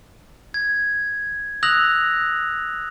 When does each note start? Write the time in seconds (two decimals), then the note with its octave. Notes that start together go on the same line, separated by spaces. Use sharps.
0.54 G#6
1.63 D#6 E6 F#6 A#6 F7 F#7